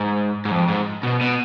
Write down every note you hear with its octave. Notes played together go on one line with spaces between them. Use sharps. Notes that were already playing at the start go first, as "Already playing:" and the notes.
Already playing: G#2
G#2
F2
G#2
B2
B2